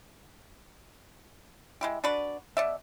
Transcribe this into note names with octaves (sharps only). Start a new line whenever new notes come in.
G#3 E4 G4
D4 F#4 B4 D5
B2 D5 E5